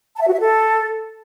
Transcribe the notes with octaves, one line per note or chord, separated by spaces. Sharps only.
A5
E5
F#4
E5
A4